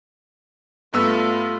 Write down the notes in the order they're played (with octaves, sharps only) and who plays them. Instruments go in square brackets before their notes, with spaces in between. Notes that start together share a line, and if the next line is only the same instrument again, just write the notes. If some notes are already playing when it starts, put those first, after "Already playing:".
[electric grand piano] G2 B3 E6 [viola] A3 F4